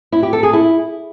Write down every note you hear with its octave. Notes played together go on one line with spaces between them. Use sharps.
E4
G4
A4
G#4
E4